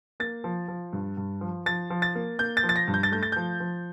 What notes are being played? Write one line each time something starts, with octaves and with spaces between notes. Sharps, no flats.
A#3 A6
F3
F3
G2
G2
F3
F3 A6
F3
A6
A#3
A#3 G6
A6
F3
A6
A#6
G2
G6
A6
A3 G6
A6
F3 G6
F3